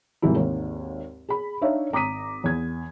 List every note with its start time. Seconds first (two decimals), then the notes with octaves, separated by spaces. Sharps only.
0.22 G#2 C3 D#3 E3 G3 E4
0.36 G#1 D#2
1.29 G#4 B5
1.61 D4 D#4 C#5 E5 F5
1.93 G#1 A#5 D6 D#6 B6 D#7
2.44 E2 G#6